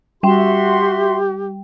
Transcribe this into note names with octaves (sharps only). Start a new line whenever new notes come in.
G3 F#4 G4 E5 G5 C6